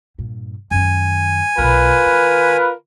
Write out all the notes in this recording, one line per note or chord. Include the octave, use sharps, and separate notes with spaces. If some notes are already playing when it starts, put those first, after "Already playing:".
G2 A#2
F#2 D#3 G#5
B1 B2 F4 A#4 B4
D#3